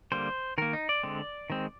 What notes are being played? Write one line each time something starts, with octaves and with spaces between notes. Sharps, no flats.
D3 G3 A#3 C5
D#3 A#3 A#4
D#4
D5
D3 G#3 C4
D#3 G#3 C4